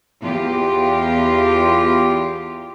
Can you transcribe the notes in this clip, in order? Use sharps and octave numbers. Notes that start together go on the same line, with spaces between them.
E2 F4 G4